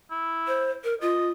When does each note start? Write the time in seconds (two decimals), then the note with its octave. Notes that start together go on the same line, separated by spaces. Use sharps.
0.11 E4
0.47 C5
0.84 A#4
1.02 F4 D#5